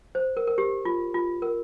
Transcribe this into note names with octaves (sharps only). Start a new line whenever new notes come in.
C5
A#4
A#4
G4
F4
F4
A#4